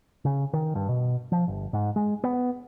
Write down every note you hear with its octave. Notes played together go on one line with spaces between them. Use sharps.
C#3
D#3
G2
B2
F3
G1
G#2
G#3
B3